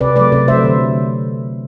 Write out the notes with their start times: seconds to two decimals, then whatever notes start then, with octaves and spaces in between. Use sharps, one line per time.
0.01 C3 B4 D5
0.16 F#3 A3 B4 D5
0.32 C3 B4 D5
0.48 F#3 A3 C5 E5
0.64 D3